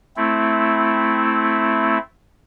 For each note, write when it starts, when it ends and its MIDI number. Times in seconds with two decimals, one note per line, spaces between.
0.17 1.98 57
0.17 1.98 60
0.17 1.98 64